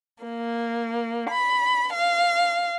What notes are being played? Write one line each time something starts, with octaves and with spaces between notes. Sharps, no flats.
A#3
B5
F5